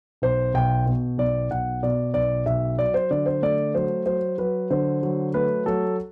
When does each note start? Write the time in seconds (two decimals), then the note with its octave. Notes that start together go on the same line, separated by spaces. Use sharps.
0.22 B1 C5
0.54 B1 G5
0.86 B2
1.18 B1 D5
1.51 B1 F#5
1.83 B2 D5
2.14 B1 D5
2.46 B1 E5
2.78 F#3 D5
2.94 C5
3.11 D3 D5
3.26 C5
3.42 A3 D5
3.74 F#3 C5
4.06 F#3 C5
4.38 F#3 B4
4.70 D3 C5
5.03 F#3
5.34 A3 B4
5.66 F#3 A4